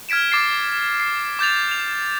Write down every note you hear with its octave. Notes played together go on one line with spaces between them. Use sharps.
F6 G#6 B6 D7 E7
D6 A6 C7
C7
D6 G6 A6 F7
F7